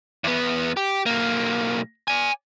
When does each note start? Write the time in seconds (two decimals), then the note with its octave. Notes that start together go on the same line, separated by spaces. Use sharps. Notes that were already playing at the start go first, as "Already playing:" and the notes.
0.24 E2 B3
0.77 G4
1.06 B1 A#3
2.08 D5 G#5